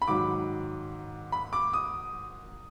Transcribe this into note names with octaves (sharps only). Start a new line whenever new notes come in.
B5
G#2 D#3 F#3 D6
B5
D6
D#6